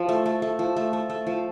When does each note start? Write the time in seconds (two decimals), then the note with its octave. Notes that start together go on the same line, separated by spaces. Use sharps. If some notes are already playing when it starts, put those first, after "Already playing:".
Already playing: F3
0.09 A3
0.26 A3
0.42 A3
0.59 F3
0.76 A3
0.93 A3
1.10 A3
1.27 F3